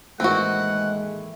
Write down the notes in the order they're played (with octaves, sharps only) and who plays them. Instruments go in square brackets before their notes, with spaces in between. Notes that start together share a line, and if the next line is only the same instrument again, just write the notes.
[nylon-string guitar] D#2 A2 E3 [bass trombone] G#3 [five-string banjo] C4 F#4 [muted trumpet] F#5